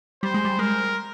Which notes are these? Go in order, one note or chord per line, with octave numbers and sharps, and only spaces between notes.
G3 C5
G#3
G3
G#3 A#4